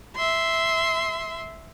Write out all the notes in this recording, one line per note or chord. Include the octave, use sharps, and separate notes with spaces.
E5 C6